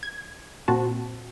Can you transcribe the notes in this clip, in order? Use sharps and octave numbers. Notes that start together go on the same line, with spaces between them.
G#6
A#2 C4 F#4 A5